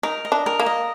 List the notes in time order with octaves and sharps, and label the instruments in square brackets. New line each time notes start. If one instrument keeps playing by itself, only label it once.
[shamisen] D#4 [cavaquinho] A#4
[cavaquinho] D#5
[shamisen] D4
[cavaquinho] A#4
[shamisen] A#3
[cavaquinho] D#5